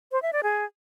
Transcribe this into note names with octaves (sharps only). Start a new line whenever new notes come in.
C5
E5
D5
G#4